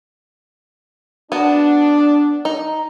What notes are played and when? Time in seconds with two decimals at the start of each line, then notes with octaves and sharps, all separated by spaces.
1.32 B3 D4 F#4
2.45 D#4